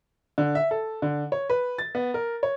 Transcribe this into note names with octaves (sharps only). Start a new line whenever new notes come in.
D3
E5
A4
D3
C#5
B4
A6
B3
A#4
C#5